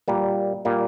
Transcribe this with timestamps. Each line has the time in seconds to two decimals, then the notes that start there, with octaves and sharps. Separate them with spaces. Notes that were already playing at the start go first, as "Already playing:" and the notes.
0.08 A#2 G3 A#3
0.65 A#2 G3 A#3